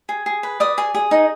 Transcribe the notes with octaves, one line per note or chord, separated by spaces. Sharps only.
G#4
G#4
B4
D5 D#6
G#4
G#4
D#4